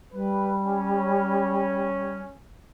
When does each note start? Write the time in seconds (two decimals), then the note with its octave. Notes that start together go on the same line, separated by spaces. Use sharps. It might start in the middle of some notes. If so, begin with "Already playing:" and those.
0.12 G3 B4
0.65 C#4